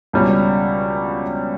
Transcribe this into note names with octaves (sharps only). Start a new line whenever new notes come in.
C#2 B2 G3 C#4